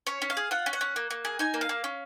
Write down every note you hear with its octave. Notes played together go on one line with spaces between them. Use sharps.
C#4 C#5
C#4
F5
G#4
F4 F#5
C#4
F#5
C#4
A#3
A#3
G#4
D#4 G#5
A#3
F5
A#3
C#4